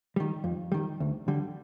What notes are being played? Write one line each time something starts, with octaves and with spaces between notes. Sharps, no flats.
D#3 G3
F2
D#3 G3
D2
D3 G3